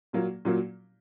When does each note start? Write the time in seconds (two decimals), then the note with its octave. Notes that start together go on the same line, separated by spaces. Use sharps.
0.13 A#2 F#3 A#3
0.45 A#2 F#3 A#3